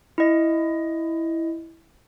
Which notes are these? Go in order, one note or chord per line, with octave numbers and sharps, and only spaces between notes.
E4 D#5